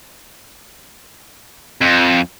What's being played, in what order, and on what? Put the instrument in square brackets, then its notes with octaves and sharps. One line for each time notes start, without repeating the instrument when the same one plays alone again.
[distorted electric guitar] F2